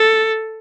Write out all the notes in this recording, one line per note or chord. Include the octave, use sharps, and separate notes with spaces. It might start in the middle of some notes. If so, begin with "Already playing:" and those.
Already playing: A4